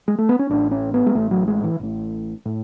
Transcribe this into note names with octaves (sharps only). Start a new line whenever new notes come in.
G#3
A3
B3
C#4
A1 A2 D4
C#4
B3
G#3
A1 A2 A3
F#3
G#3
E3
A1 A2
A2